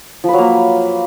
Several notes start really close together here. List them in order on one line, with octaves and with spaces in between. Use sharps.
F3 B4 F#3 A#3